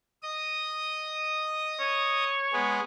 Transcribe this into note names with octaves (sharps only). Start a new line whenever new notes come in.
D#5 D#6
C#5
G#3 B3 G#4